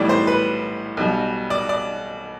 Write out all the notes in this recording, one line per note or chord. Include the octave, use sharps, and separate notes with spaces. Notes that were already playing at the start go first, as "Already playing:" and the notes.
Already playing: B1 A2 E3 G3 D5
C5
B4
B1 B2 G3
D5
D5